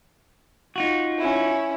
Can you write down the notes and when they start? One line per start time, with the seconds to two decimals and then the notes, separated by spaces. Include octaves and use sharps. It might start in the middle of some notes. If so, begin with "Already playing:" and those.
0.76 D#4 F4 F#4
1.18 C#4 E4